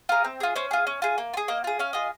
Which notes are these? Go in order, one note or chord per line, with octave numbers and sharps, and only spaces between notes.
F4 G#4 A#4
C4
F4 G#4
C#4 C5
F4 G#4
C#4
F4 G#4
A#3
F4
G#4
A#3 D#5
F4 G#4
C#4 F5
F4 G#4 D#5